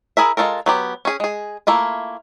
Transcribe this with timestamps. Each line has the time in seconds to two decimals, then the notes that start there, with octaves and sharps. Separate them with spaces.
0.17 E4 G#4 A#4 E5
0.37 G#3 D4 F4 A4 A#4
0.66 F#3 B3 G4
1.05 C#4 G#4
1.20 G#3 G#4
1.67 A3 A#3 E4 F4